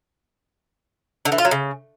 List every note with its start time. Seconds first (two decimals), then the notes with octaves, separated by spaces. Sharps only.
1.25 D3
1.32 E3
1.38 F4
1.45 F#3
1.51 C#3